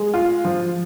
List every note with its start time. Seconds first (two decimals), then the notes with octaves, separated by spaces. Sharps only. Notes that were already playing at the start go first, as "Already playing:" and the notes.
Already playing: G#3
0.14 F4
0.45 F3